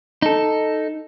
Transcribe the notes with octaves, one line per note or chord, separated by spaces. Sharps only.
D#4 A4